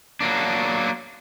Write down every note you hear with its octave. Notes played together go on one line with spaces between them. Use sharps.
F#3 A#3 D4